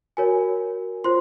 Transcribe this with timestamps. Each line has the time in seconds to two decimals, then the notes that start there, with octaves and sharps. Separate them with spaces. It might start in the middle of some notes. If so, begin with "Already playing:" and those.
0.17 F#4 A#4 C#5 G#5
1.04 F4 C5 C6